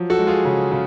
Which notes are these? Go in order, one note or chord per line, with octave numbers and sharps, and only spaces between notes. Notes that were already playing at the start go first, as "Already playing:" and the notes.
Already playing: F3 F#3
F#4 A4
G#3
F4 G#4
C#3
C#3